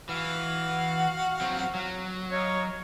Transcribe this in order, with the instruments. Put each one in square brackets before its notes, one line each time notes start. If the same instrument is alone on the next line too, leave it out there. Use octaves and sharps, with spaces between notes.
[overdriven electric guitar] E3 [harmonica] F#4 F5 F#5
[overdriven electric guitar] F#3 C4
F#3
[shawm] C#5 [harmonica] D#5 F5 A#5